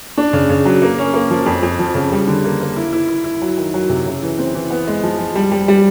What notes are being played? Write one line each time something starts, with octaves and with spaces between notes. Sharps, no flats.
D4
C#3
C#3
F#3
A#3
C#4
A#3
F3
F2
F2
F3
C#3
G3
D3
A#3
A#3
E4
E4
E4
E4
F#3
D#3
F#3
C3
C#3
E3
C4
E3
B3
G#3
F3
F3
G3
G3
G3